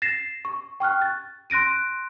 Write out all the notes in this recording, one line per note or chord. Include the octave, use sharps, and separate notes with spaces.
A6 A#6 C7 E7
C#6
G5 C#6 F6 F#6
A6
C6 F#6 A#6 D7 D#7